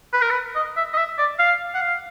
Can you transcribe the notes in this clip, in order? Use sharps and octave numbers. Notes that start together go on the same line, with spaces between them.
B4
A#4
B4
D#5
E5
D#5
E5
D5
F5
F#5
F5